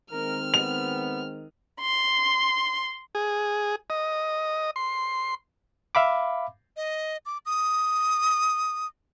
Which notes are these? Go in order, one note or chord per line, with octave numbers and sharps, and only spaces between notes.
D#3 G#3 C4 A#4 F6
B3 F7
C6
G#4
D#5
C6
E5 F5 B5 D6
D#5
D6
D#6